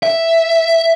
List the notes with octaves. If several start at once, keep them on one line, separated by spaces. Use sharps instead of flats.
E5